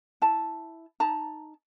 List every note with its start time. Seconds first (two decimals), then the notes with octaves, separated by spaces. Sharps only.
0.22 E4 A5
1.00 D#4 A5 A#5